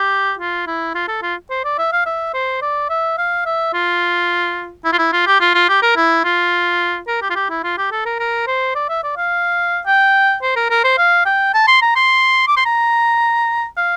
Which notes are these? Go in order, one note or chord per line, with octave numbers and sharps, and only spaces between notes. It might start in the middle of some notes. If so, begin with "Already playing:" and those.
Already playing: G4
F4
E4
F4
A4
F4
C5
D5
E5
F5
E5
C5
D5
E5
F5
E5
F4
E4
F4
E4
F4
G4
F4
F4
G4
A#4
E4
F4
A#4
G4
F4
G4
E4
F4
G4
A4
A#4
A#4
C5
D5
E5
D5
F5
G5
C5
A#4
A#4
C5
F5
G5
A5
C6
A#5
C6
D6
C6
A#5
F5